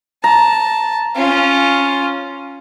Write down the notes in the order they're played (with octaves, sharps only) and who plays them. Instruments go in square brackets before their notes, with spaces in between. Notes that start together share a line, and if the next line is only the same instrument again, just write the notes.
[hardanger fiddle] A5 [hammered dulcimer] A#5
[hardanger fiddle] C#4 F4